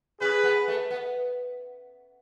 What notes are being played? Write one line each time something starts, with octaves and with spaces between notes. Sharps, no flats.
C#3 G#4 B4
B3
A3
B3